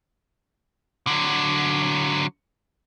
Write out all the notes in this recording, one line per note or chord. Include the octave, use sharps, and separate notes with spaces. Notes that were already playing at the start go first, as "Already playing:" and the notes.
D3 F#3